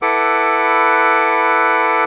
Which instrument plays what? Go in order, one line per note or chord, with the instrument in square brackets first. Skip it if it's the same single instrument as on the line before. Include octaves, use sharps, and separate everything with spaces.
[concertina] E4 A4 B4 F#5 D6